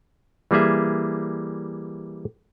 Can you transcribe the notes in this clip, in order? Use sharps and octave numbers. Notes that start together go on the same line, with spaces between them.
E3 G3 A#3 G#4 E5